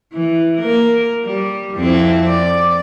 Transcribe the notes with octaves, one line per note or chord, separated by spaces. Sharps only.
E3
A#3 A#4
G3
F2 C4 E4
D5